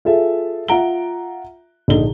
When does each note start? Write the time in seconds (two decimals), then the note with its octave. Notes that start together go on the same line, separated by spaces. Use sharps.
0.05 F4 G#4 A4 E5
0.68 F4 E5 F#5 A#5 D7 G7
1.88 A#1 D3 D#4 G7